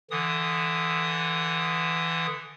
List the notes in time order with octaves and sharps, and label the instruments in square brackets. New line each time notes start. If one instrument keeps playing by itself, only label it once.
[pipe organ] D3 E3 D#6